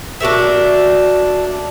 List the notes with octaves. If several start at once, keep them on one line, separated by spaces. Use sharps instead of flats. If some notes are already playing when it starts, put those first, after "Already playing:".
D4 F#4 A#4 E5